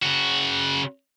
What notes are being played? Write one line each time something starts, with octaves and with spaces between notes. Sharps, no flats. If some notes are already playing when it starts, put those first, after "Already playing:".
C#3 F#4